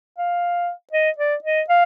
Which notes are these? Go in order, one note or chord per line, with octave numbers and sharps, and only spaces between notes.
F5
D#5
D5
D#5
F5